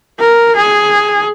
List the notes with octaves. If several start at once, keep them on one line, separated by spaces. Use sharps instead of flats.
A#4
G#4